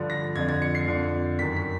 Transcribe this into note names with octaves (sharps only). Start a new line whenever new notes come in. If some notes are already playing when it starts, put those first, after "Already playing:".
Already playing: G2 D3 F3
A#6
F2 D3 F3 G#6
G#6
C#7
C7
F2 D3 F3
F#2 D#3 B6
B6